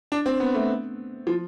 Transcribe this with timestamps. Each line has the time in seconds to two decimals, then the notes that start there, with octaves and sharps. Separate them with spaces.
0.12 D4
0.26 C4
0.40 B3
0.54 A3
1.27 F3